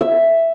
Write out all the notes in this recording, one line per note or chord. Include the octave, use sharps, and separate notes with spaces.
E5